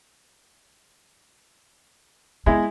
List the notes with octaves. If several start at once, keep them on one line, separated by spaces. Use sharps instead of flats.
G#3 B3 E4